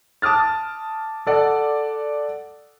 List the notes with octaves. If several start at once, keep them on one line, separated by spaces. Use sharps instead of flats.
A5 D6 D#6 F6 A6
A4 D5 F#5